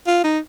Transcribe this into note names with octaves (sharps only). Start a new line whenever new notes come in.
F4
D#4